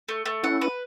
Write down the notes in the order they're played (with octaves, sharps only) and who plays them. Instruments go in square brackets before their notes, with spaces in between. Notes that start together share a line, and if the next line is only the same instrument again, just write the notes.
[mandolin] A3
A3
[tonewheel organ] C#4 E4 [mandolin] F#5
[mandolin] B4